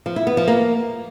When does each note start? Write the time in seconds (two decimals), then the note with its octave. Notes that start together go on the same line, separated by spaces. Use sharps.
0.06 F3
0.16 E4
0.27 B3
0.37 F3
0.48 A#3